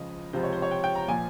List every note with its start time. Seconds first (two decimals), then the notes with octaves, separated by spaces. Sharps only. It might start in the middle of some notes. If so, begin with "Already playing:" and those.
Already playing: C#2 C#3 F3 D#5
0.33 C#2 C3 F3 C5
0.43 C#5
0.53 C5
0.62 C#5
0.71 G5
0.84 G5
0.95 A#5
1.08 A#2 F3 G#5